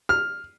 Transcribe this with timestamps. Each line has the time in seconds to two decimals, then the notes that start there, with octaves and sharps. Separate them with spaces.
0.09 F6